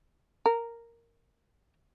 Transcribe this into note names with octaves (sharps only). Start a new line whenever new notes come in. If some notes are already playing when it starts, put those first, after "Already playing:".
A#4